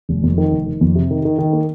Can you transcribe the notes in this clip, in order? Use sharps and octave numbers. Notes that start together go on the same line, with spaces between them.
F1
F2
D#3
F1
D#3
F2
C3
D#3
D#3
D#3
A#3